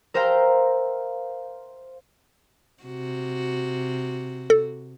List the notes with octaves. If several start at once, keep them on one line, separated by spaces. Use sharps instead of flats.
A#4 C5 E5 F5 G5 A#5
C3 F#4
A4